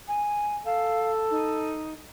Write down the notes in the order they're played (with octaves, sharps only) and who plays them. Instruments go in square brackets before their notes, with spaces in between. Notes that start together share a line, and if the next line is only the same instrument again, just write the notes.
[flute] G#5
[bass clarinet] A4 [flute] F5
[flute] D#4